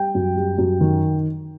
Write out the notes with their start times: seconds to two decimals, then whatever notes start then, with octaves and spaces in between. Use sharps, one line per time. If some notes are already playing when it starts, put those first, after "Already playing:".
Already playing: G3 G5
0.15 F#2
0.36 G3
0.58 F#2
0.81 D#3